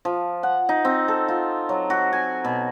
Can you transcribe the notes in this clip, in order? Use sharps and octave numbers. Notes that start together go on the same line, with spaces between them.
F3
F#5
D#4
C4
A4
F4
F#3
F#4
G#5
B2